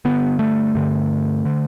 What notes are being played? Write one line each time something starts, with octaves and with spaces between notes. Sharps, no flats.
G2 D3 B3
A3
G2 D3
D3